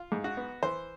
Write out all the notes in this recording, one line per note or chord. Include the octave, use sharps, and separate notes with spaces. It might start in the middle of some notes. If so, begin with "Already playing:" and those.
Already playing: F4
G#2
F#4
B3
E3 C5